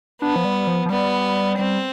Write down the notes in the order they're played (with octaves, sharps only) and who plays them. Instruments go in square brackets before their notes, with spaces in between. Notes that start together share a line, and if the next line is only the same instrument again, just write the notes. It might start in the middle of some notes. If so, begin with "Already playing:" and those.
[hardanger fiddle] B3 [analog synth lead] D4
[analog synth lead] F3
G3
F3
F3
[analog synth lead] G3 [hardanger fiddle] B3
[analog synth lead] G3 [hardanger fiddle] C4